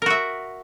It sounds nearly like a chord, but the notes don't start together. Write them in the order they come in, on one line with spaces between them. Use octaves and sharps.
A#4 F#4 E5